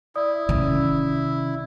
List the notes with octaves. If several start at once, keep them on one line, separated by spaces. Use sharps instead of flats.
E4 D5 D#6
C3 D#3 C#4